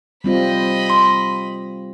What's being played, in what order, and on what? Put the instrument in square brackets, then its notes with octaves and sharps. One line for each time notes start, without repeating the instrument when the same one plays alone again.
[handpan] G3 C4 F4 [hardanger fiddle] D#5 B5
[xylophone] C6